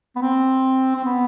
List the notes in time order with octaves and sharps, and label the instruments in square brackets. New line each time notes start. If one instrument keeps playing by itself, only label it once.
[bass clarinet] B3
C4
C4
B3